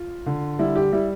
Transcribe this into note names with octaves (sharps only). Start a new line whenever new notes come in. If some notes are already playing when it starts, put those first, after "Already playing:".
Already playing: F4
D3
G3 E4
G4
G3 E4